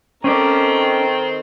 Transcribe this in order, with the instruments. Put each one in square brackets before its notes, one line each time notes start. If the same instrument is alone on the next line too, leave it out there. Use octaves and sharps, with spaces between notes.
[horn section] D#3 C4 [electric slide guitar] C#4 D5 [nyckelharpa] A4 A#5